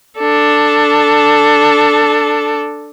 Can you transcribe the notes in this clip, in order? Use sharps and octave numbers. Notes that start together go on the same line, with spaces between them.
D4 A4